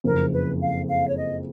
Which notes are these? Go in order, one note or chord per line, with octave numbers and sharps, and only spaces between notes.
F#1 F2 C#3 A#4
B4
F5
F5
C#5
D#5